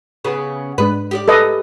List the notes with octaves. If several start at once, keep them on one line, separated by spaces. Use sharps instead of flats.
C#3 B3 G#4
G#2 G#3 D4 B4
G4 G#4 D5
A4 B4 D#5